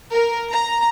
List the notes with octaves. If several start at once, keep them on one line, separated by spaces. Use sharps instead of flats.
A#4
A#5